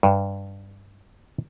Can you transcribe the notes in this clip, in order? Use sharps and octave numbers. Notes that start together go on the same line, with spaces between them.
G2